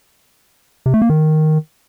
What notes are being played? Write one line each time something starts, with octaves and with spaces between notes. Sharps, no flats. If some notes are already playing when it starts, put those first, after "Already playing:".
C3
A3
A#3
D#3